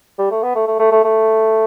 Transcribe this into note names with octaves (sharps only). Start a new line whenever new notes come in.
G3
A3
B3
A3
A3
A3
A3
A3